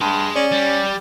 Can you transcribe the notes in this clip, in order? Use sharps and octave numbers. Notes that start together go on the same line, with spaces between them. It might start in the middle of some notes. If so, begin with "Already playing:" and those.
G2 G#4 C6
C#4 D5
G3